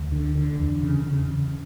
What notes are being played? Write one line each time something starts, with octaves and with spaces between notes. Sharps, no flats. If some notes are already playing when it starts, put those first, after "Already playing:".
Already playing: D2
D3
D3
E2
C#3
C#3
C#3